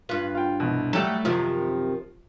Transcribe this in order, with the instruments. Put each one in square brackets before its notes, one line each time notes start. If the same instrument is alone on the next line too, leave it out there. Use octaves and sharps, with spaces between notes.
[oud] G2 B4 [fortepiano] F4
[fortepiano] F4 G5
C2 B2
[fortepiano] F#3 G3 [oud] A3 A4
[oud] F#2 C3 D#3 [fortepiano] F3